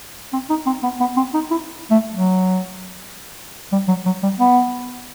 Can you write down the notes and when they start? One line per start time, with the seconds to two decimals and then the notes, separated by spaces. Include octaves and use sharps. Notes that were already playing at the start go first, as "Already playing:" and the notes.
0.33 C4
0.50 D#4
0.67 C4
0.83 B3
1.00 B3
1.17 C4
1.34 D#4
1.51 E4
1.91 A3
2.14 F#3
3.72 G3
3.88 F#3
4.06 F#3
4.23 G3
4.39 B3